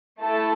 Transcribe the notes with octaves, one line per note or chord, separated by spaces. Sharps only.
A3 E4 A4 A5